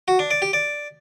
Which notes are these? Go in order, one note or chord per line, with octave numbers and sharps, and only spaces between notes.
F#4
D4
D5
G4
D5